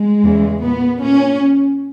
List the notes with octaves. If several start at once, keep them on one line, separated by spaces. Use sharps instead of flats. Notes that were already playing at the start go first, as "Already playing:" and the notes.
Already playing: G#3
E2 C#3 E3
A#2 B3
A#2 C#4